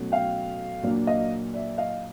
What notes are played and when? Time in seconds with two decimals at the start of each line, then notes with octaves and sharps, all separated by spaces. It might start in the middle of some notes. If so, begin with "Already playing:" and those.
Already playing: B2 F#3 A3 C#4
0.12 F5 G5
0.83 A#2 F#3 A#3 D4
1.07 D#5 F5
1.54 D5 E5
1.78 D#5 F5